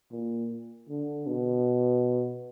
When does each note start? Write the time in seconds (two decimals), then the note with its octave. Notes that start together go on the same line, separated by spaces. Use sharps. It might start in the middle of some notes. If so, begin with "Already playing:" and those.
0.12 A#2
0.89 D3
1.27 B2